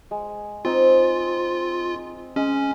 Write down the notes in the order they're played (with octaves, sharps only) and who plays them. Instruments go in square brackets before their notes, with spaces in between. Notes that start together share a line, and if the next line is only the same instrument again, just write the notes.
[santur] G#3
[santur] C4 D#4 C5 [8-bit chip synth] F4
[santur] G#3 [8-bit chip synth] C#4